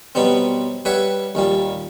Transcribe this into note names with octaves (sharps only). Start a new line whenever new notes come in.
B2 F#3 G3 B3 C4
G3 B4 C#5 E5 F#5
D#2 A#2 G3